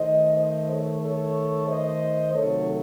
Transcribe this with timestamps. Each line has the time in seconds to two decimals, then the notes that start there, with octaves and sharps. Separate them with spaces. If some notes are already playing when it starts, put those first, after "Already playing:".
Already playing: D#3 A3 C5 D#5
0.37 C5 D#5
0.70 A4 C#5
1.03 A4 C#5
1.68 C5 D#5
2.34 C3 D#3 F#3 A3 A4 C#5